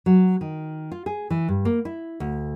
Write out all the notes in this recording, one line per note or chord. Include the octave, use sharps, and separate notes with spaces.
F#3
D#3
F4
G#4
E3
G2
A#3
E4
D2